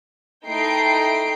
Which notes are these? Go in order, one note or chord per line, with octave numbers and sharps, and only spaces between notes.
A3 D#4 E4 G5 C7 D7